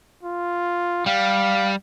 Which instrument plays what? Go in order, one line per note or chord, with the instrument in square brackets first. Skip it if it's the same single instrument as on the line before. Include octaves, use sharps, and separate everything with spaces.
[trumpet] F4
[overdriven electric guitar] G3 [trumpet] F5